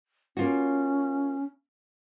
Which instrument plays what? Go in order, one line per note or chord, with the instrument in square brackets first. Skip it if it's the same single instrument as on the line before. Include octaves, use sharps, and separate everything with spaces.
[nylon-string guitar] A#3 F4 F#4 [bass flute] C#4